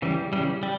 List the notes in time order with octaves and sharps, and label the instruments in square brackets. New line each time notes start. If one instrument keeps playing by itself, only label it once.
[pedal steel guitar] C#3 E3 G3
C#3 E3 G3
G3